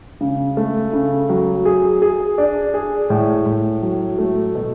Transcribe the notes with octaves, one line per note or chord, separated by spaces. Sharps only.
C#3
A3
C#3
F#3
G#4
G#4
D4
G#4
A2
A2
F#3
A3
B2